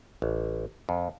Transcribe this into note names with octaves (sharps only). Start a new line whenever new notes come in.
A1
F2